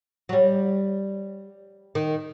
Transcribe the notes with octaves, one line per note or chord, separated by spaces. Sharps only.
F#3
G3
D#3